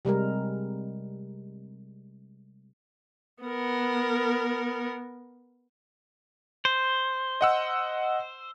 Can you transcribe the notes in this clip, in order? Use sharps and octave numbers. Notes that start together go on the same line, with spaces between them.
C3 G3 G#3 A#4
B3 A#4
C5
D#5 F#5 E6